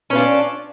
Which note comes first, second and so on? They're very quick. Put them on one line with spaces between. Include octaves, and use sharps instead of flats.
C#4 B4 F4 D4